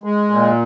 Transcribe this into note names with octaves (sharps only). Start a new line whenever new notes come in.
G#3
A#2